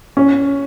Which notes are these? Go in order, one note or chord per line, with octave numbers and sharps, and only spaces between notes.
C#4